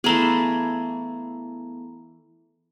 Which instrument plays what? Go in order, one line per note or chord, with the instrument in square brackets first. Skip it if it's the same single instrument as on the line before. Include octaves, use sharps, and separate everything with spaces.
[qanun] E3 A3 G#4 [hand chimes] B3 A#5